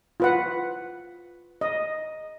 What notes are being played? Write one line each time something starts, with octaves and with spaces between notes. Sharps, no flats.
F4 B4 F#5
D#5